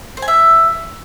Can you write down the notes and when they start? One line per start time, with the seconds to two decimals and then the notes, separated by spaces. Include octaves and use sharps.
0.17 C5
0.22 G#5
0.28 E5